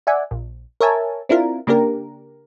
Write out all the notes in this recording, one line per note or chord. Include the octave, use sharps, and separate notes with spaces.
D5 E5 F#5 G#5
A#1
A#4 C#5 E5 G#5 A5
C4 D4 E4 F4 A#4
C#3 A#3 D4 G4 A#4